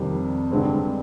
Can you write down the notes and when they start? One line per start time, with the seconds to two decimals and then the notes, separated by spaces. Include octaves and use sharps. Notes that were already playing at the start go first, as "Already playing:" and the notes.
Already playing: F2 C3 D#3 G3 D4
0.51 G2 D3 G#3 C4